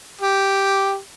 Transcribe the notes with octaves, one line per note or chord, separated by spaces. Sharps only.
G4